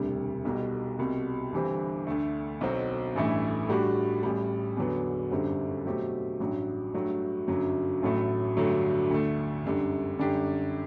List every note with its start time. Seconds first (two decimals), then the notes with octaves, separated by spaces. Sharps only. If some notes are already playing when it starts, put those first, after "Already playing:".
Already playing: E1 D2 C3 G3
0.45 B1 B2 G3
0.99 C2 B2 G3
1.52 G1 G2 E3 G3 C4
2.07 D2 D3 A3
2.61 B1 B2 F#3 C4
3.15 A1 G2 E3 A3 E4
3.69 A2 G3 D4 F#4
4.23 A1 A2 G3
4.77 E2 D3 F#3 B3
5.31 G1 F#2 D3 G3 C4
5.85 B2 F#3 A3 C4 G4
6.40 A1 G2 F#3
6.94 G2 F#3 A3
7.48 G1 F#2 F#3
8.02 A1 A2 F#3 A3
8.57 G1 G2 D3 F#3 A3
9.10 D2 D3 A3
9.64 G1 F#2 D3 G3
10.19 F#2 D3 G3 D4 G4